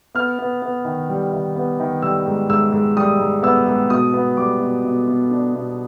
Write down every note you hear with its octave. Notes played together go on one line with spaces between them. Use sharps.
B3 F6
B3
B3
D#3
G3
D#3
B3
D#3
G3 E6
G#2
G#2 E6
G#2
G3 D#6
G#2
B3 E6
G#2
B2 D#6
B3
G3 D6
B2
B2
B2
D4
B2